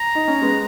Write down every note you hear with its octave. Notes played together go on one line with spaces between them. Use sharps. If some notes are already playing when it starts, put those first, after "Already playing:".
Already playing: A#5
D#4
C#4
G#3 B3